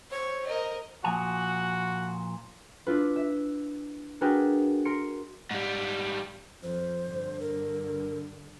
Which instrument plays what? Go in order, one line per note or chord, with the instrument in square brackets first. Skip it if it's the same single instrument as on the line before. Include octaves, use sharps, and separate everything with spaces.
[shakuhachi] C5 [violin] C#5
[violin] A#4 D#5
[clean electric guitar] A#2 F3 G#5 [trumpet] F#4
[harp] D4 E4 F4 B4
E5
D4 F#4 G#4 A#4 B4 G5
A#4 C6 C#7 D7
[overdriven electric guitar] G#2 G3
[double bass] F2 F3 [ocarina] C5
[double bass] G2 D3
[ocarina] A#4